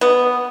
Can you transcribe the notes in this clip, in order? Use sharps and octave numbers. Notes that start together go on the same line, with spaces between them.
B3